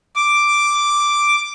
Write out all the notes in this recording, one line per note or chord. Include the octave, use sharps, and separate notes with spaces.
D6